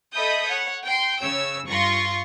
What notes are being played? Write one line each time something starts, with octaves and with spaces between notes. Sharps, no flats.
A4 D#5 E5 B5 D#6 G6
C#5 F#5
G5 C6
C#3 C#5 E6
G2 F4 C6 C#6 A#6